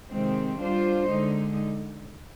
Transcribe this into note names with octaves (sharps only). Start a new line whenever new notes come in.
C3 D#3 G#3 C4
G3 D4 F4 C5
D3 G#3 D#4